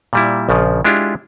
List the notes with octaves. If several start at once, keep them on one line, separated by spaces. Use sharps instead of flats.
A#2 G3 E4
A#1 C#3 F3
G#3 D4 E4 F4 G4